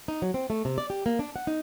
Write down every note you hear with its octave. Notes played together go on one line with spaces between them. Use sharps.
D#4
F#3
C4
A3
C3
D5
G4
A#3
D4
F#5
D#4